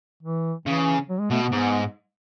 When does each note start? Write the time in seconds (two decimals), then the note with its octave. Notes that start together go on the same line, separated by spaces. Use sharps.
0.23 E3
0.66 C#3 E3
1.10 F#3
1.20 G#3
1.31 B2 A3
1.42 B3
1.53 G#2 B3